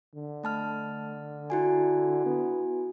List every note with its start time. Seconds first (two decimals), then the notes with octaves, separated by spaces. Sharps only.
0.15 D3
0.44 A3 A5 F6
1.50 E4 F#4 G#5
2.26 B3